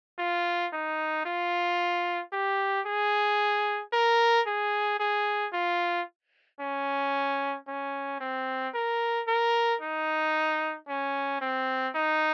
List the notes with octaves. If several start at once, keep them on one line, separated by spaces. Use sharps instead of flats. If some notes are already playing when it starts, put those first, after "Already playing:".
F4
D#4
F4
G4
G#4
A#4
G#4
G#4
F4
C#4
C#4
C4
A#4
A#4
D#4
C#4
C4
D#4